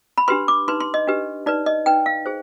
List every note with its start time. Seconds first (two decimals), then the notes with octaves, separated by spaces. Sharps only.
0.18 B5
0.28 D4 G4 B4 C6
0.48 D6
0.68 D#4 B4 C6
0.80 C6
0.94 D#5
1.07 D4 G4 B4
1.46 D#4 B4 D5
1.66 D#5
1.86 D#4 B4 G5
2.06 F5
2.26 G#4 C5